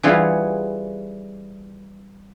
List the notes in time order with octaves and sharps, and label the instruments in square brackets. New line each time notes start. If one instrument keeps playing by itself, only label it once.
[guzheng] E3 G3 F4 G#4 F5 F#5